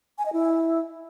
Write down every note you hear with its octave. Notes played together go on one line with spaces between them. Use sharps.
G#5
D#5
E4